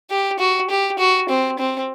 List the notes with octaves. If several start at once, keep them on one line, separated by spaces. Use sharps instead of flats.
G4
F#4
G4
F#4
C4
C4